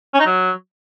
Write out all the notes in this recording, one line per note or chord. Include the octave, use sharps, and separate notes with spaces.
C#4
D#4
F#3